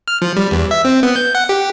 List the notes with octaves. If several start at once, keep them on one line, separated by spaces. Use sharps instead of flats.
F6
F3
G3
E2
E5
C4
B3
G6
F#5
G4